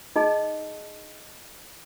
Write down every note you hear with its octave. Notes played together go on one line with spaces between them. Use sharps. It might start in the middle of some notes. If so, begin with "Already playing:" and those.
D#4 G#4 D#5 A5